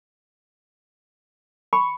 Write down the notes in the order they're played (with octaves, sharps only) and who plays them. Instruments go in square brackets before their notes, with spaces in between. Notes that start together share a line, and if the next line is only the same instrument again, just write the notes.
[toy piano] B5 [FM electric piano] C#6